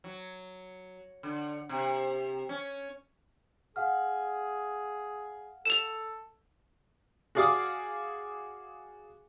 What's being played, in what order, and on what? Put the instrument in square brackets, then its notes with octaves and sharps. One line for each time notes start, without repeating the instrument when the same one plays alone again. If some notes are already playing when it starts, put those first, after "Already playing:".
[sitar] F#3
D3
C3
C#4
[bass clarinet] G#4 [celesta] F5 F#5 F6
[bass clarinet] A4 [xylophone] E7 F7
[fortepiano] F#4 G#4 D5 F5 D6 D#6